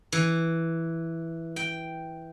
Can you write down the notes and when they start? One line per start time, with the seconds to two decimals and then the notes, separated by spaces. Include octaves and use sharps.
0.12 E3
1.56 G5